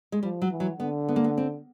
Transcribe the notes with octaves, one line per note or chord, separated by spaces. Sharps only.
G#3
F3 G3
F#3
E3
F#3
D3 B3
B3
A#3
B3
C4